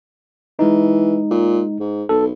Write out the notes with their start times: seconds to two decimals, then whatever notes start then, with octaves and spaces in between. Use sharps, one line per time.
0.59 E3 G#3 D#4
1.31 A#2
1.80 G#2
2.09 B1 A4